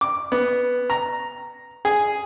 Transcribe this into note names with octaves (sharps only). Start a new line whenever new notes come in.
D6
B3
A#5
G#4